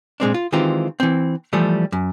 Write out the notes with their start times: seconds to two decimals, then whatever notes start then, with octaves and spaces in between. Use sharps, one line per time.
0.20 A#2 G#3 C4 D4
0.34 F4
0.52 D#3 E3 G#3 C4 F4 G4
1.00 E3 C4
1.53 E3 F3 G3 A3
1.92 F#2